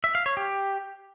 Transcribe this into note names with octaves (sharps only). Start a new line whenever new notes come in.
E5
F5
C#5
G4